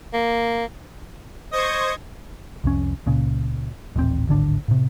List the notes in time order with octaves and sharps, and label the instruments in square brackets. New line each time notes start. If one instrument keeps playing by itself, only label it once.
[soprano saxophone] A#3
[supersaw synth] C5 C#6 G#6 [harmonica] D#5
[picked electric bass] C2 F2 C#4
C#2 A#2 C#3
D#1 A1 G#2 C4
D1 G#1 D3 D4
A2 C3